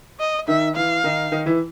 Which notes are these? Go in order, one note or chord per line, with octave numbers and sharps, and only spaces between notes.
D#5
D#3 D#4 E5
E3 E4 F5
D#3 D#4
D#3 D#4
E3 E4